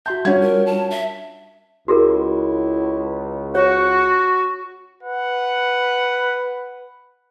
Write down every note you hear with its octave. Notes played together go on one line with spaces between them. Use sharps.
F#4 E5 A5 C6 G6
G3 C#4 D4 F4 F#4 G#6
A#4
A5
E5
C#2 E4 F#4 G#4 A#4
F#4 C#5 F#5
B4 F#5